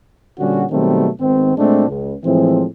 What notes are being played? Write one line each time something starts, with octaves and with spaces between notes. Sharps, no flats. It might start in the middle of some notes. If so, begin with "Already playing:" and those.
A#2 D3 G3 C#4 F#4
B2 D#3 F#3 G3 A3 C4
G#1 G#2 D#3 B3 C4
A#2 G#3 A3 C4 D4
C#2
A2 E3 F3 G#3 C4